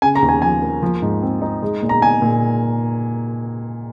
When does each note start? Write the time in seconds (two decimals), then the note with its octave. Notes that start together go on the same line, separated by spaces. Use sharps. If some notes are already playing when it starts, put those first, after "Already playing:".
0.02 C#3 G#5
0.15 A#5
0.22 D#2
0.29 G#5
0.42 F3 G#5
0.62 A#3
0.83 F3
1.02 G#2
1.22 C4
1.41 D#4
1.62 G#3
1.82 A#2
1.89 A#5
2.02 D#4 G#5
2.22 A#2